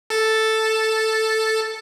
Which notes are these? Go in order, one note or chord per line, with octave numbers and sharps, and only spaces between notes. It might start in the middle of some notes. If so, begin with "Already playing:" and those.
A4 A5